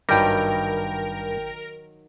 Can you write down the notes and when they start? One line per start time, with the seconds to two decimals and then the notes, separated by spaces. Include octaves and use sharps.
0.09 G#1 G2 D#3 F#3 G3 A#4 G5 A#6